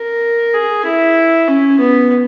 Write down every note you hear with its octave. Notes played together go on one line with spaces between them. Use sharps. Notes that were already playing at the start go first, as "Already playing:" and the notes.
Already playing: A#4
G#4
E4
C#4
B3